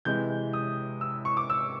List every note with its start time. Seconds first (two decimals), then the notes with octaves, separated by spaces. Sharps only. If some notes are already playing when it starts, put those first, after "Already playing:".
0.05 C3 E3 G#3 G6
0.53 D#6
1.01 E6
1.25 C#6
1.37 D6
1.50 E6